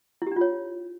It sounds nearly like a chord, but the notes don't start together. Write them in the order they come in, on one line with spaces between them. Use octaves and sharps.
E4 G4 D4 F4 C#5